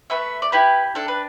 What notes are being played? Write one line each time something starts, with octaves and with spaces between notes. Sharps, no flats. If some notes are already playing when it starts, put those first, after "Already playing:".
A3 B4 E5
D5
E4 G4 B4
D4 A4
B4